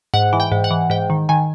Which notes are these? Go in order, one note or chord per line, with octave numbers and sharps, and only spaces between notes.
G#2 F#5
E3
G5
G#2
F#5
E3
G#2 G5
D#3
D#3 G#5